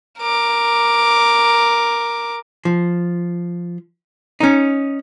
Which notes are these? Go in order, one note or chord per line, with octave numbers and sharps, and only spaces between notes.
A#4 D6
F3
C#4 D#4